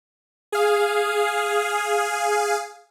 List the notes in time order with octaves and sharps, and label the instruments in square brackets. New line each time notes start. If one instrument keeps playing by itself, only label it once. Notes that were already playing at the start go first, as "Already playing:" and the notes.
[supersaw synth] G#4 F5